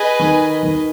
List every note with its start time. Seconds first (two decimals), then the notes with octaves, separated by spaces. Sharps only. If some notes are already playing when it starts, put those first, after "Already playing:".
Already playing: G#4 B4 D#5 G#5
0.20 D#3
0.63 D#3